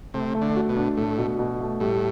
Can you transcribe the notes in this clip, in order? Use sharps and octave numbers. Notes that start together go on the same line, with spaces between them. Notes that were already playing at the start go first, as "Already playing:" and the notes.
C3 A3
A3
D3
F#4
B2
D4
A2 A3
B2
B2
A3
A2 G3